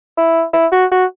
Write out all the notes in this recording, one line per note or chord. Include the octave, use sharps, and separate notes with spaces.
E4
E4
F#4
F#4